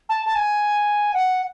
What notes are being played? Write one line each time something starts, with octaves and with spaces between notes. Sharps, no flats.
A5
A5
G#5
F#5